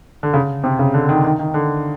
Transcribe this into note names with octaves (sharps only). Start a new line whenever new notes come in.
D3
C#3
C3
C#3
D3
D#3
D#3
D#3
D3